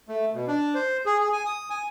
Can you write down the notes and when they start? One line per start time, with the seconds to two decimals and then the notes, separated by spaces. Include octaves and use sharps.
0.08 A3
0.34 B2
0.48 D4
0.74 C5
1.06 G#4
1.20 G#4
1.33 G#5
1.46 D#6
1.70 G#5